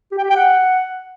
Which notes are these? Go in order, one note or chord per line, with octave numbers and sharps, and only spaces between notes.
G4
G5
G4
G5
F#5